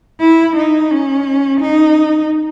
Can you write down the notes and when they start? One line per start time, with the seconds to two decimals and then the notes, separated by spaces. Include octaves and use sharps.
0.21 E4
0.57 D#4
0.91 C#4
1.61 D#4